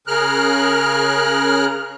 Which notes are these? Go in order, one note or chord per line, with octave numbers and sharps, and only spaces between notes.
C#3 G#4 A#4 F6 F#6